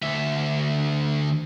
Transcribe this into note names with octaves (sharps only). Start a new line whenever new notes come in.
D2 E5